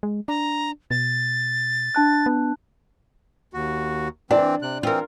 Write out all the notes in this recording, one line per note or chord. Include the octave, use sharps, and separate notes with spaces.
G#3
D4 A#5
B2 A6
D4 A5 F#6
B3
D#2 F#4
E3 C4 D4 D5
C3 F#6
E3 C4 F4 A#4